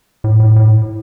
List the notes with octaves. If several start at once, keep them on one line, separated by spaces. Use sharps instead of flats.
A2
A2
A2